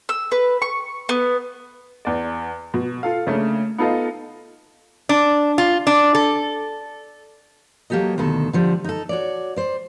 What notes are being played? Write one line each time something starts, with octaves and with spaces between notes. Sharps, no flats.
E6
B4
C#6
B3
E2 D5
B2
F4 A4 F5
C#3 A3 A#3 D4
B3 D#4 F4 A4 D#5 F5
D4
F4
D4
A4
F#3 A#3 C#4 G4 A4 D#5
D2 B2 D#3 A4
D3 F3 G3
D#4 A4
F#4 C#5 D5
C5 D5